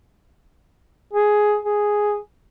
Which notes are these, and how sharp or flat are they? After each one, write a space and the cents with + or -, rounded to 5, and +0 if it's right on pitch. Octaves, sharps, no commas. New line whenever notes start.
G#4 +10
G#4 +0